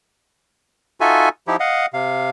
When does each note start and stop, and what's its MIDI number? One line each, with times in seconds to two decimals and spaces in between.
1.01 1.29 63
1.01 1.29 65
1.01 1.29 66
1.01 1.29 69
1.01 1.29 76
1.01 1.29 80
1.47 1.56 53
1.47 1.56 63
1.47 1.56 64
1.47 1.56 67
1.60 1.86 75
1.60 1.86 77
1.60 1.86 78
1.94 2.30 48
1.94 2.30 77